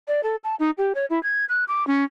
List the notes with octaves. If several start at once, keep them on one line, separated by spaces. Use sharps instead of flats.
D5
A4
A5
D#4
G4
C#5
E4
G#6
F#6
D6
C#4